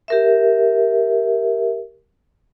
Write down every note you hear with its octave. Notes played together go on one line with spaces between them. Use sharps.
G4 A#4 E5